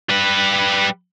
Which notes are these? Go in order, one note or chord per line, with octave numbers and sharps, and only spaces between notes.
G3 B4